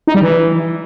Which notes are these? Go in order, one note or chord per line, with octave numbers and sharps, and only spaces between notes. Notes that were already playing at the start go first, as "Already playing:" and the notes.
D#4
G3
E3